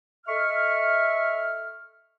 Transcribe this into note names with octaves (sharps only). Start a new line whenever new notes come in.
A4 D#5 E5 C#6 F6